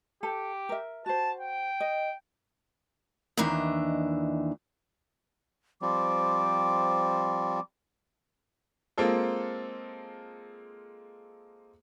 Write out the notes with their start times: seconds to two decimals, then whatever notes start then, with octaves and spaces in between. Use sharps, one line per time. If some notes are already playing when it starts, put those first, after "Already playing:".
0.23 G4 A4
0.69 A#4 E5
1.06 F#4 C5 A5
1.40 G5
1.80 D#5
3.37 D#2 D#3 E3 D4 D#4 E5
5.82 F3 G3 C4 D6
8.98 G#3 A#3 C4 F4 A4